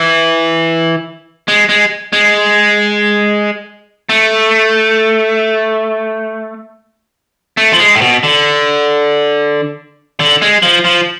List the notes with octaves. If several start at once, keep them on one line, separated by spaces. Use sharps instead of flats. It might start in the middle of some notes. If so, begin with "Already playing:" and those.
Already playing: E3
G#3
G#3
G#3
A3
A3
F3
G#3
A2
B2
D3
D3
G#3
F3
F3